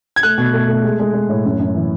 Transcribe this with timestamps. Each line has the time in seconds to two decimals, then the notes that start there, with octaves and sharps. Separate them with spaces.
0.16 G#6
0.23 A3 F#6
0.38 B2
0.53 A3
0.68 A3
0.84 G#3
0.99 G#3
1.13 G#3
1.29 A2
1.45 F#2
1.59 F#2
1.75 E3